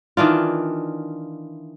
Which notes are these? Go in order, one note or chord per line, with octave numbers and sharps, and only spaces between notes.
D#3 E3 D4 F4